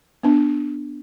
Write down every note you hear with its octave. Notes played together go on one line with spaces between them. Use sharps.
B3 D4